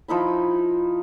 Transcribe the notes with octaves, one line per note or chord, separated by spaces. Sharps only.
F3 D#4 E4 B5